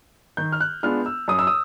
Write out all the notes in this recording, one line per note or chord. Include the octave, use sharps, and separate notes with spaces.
D#3 G6
F6
F#6
G#3 B3 D4 F4 F6
E6
F#2 D#6
E6
D#6